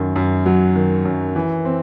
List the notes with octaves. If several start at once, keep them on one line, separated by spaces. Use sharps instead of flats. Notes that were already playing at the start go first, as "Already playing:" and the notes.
Already playing: F#2 D#3
F#2
F#3
D#3
F#2
E3
C4